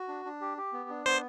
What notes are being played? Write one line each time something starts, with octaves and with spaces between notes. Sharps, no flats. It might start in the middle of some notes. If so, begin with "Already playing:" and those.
Already playing: F#4
D4
D4
G4
G4
B3
D4
B3 C5